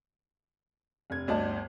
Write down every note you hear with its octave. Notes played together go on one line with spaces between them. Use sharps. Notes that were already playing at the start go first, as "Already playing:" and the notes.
F1 G#6
G1 D2 D5 D#5 A5